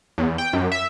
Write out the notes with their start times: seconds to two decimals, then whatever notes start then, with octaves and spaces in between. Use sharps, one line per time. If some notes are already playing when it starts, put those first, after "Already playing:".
0.18 E2
0.38 G5
0.53 F#2
0.72 E5